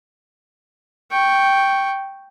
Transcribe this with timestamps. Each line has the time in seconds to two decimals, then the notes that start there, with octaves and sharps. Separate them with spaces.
1.11 G5 C#6